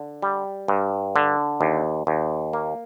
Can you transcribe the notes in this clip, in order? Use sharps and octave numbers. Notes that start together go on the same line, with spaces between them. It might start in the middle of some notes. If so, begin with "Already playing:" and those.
Already playing: D3
G3
G2
D3
D#2
D#2
A#3